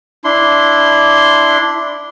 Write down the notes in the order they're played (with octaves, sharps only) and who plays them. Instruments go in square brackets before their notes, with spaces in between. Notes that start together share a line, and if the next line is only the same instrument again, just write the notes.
[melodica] D4 E4 C6